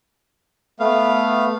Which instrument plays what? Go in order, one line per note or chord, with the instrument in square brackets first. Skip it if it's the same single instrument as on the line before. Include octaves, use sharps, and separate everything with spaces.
[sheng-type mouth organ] A3 B3 F5